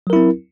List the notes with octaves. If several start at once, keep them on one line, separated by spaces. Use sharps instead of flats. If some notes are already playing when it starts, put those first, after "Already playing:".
F#3 C4 E4 A#4